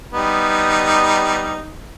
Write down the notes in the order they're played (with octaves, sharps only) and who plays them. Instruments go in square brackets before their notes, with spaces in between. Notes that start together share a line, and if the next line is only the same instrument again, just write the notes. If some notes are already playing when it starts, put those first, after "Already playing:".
[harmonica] G3 B3 D#4